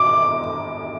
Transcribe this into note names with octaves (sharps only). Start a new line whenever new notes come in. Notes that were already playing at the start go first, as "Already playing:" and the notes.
Already playing: D6